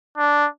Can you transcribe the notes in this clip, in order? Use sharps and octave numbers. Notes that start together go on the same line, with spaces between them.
D4